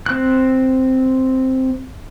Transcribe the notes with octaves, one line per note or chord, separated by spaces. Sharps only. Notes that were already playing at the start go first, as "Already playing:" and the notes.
C4 F#6